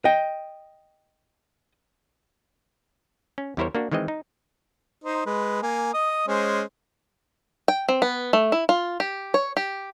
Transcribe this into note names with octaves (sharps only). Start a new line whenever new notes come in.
D#5 G5
C#4
E2 G3 E4 A#4 C5 C#5
A#3 D4 F#4
D#3 E3 G#3 C4 D#5
D#4
D#4 C5
G#3 B4
A#3 G#5
D#5 D#6
G#3 C#4 C5
G5
C4
B3
A3
E4
F4
G4
C#5
G4